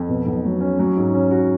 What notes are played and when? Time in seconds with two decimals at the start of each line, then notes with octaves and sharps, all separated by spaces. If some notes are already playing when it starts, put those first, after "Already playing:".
Already playing: F2
0.09 B2
0.26 B1
0.45 F#3
0.61 C#4
0.79 F#3
0.97 G#2
1.14 C#4
1.31 F#4